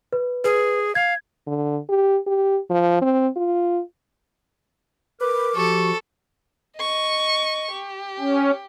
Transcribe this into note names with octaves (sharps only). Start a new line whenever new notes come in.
B4
G#4 B4
F5 G#6
D3
G4
G4
F3
C4
F4
A#4 B4 D6
F3 F#4 G4 A4 C#6
D#5 C#6
G4
C#4